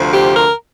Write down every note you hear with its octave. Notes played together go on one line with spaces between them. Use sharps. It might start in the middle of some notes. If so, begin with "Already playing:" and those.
Already playing: D2 C3 F3
G4
A#4